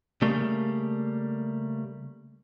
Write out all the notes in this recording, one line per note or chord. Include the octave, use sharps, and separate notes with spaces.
C#3 G3 A3 A#3